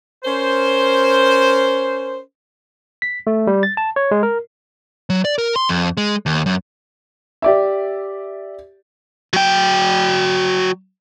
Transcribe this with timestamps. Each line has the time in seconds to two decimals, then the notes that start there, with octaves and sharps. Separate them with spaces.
0.25 C#4 A#4 C5
3.02 B6
3.27 A3
3.47 G3
3.63 A6
3.77 A5
3.96 C#5
4.11 G#3
4.23 A#4
5.10 F#3
5.25 D5
5.38 A#4
5.56 C6
5.69 F2
5.97 G#3
6.26 D#2
6.46 F#2
7.42 G4 D5 E5
9.33 F#3 G5